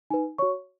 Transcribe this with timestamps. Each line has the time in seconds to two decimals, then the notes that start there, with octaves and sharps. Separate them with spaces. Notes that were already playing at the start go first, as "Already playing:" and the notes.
0.10 D#4 B4 G#5
0.38 F#4 C#5 C#6